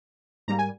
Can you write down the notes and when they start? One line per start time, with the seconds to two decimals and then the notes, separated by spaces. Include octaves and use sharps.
0.48 G#2 G3 A#3 A#5
0.59 G#5